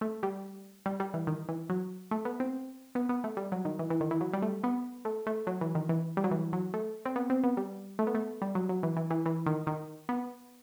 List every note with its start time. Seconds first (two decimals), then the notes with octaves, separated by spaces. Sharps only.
0.01 A3
0.23 G3
0.86 G3
1.00 G3
1.14 E3
1.27 D#3
1.49 E3
1.70 F#3
2.11 A3
2.25 B3
2.40 C4
2.95 B3
3.09 B3
3.24 A3
3.37 G3
3.52 F#3
3.65 D#3
3.79 E3
3.90 E3
4.01 D#3
4.11 E3
4.21 F#3
4.33 G3
4.42 A3
4.64 B3
5.05 A3
5.27 A3
5.47 F#3
5.61 E3
5.75 D#3
5.89 E3
6.17 G3
6.24 F#3
6.31 E3
6.53 F#3
6.74 A3
7.05 C4
7.16 B3
7.30 C4
7.44 B3
7.57 G3
7.99 A3
8.07 B3
8.15 A3
8.42 G3
8.55 F#3
8.69 F#3
8.83 E3
8.96 E3
9.10 E3
9.26 E3
9.46 D#3
9.67 D#3
10.09 B3